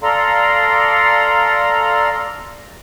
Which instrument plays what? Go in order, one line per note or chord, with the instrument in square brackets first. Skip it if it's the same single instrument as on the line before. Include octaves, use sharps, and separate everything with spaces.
[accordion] A4 D5 F5 A#5 C6